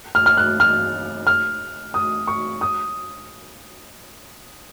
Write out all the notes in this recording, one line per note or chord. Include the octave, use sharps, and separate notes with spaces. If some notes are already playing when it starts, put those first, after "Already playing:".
F6
F6
F#6
F6
F6
D#6
C#6
D#6